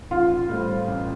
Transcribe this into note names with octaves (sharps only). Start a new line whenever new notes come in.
A1 F4
A2 G3 C4
A1